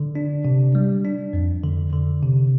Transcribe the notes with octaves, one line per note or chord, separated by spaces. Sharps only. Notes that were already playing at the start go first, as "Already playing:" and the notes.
Already playing: D3
D4
C3
G3
D4
F2
D3
D3
C3